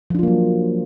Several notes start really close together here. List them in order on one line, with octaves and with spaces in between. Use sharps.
F3 D4 F4 A#3 F#3